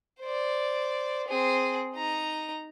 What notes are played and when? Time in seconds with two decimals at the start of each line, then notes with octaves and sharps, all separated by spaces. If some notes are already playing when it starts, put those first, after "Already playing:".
0.21 C5 D5
1.28 C4 G#4
1.95 D#4 A#5